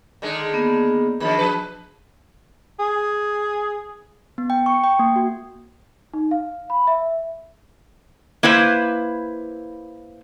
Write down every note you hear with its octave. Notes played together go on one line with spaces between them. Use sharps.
D3 D#3 G#3
A#3 B3
D#3 F3 F#3 D4 G#4 B5
F3 B4
G#4
B3
G5
C#6
G5
A#3
F#4
D#4
F5
B5
E5
A#3 E4 B4 C5